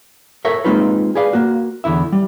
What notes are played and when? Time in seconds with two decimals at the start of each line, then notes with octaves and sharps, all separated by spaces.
0.45 A4 A#4 C#5 E5
0.65 G#3 A#3 C4 D#4 F4 B4
1.15 G#4 B4 D5 F5
1.33 A#3 F#4
1.84 E2 D3 E4 E5
2.12 G3